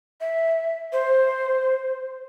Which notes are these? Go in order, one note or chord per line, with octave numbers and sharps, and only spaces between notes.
E5
C5